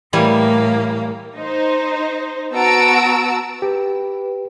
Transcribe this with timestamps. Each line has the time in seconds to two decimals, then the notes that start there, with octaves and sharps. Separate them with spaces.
0.13 A2 E3 G3 A#3 G#5
1.35 D#4 C5
2.52 B3 F#4 A5 A#5 E6 D7
3.62 G4 B4